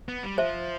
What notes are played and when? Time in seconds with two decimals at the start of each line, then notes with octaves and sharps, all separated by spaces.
0.09 B3
0.23 G3
0.38 F3 C5 E5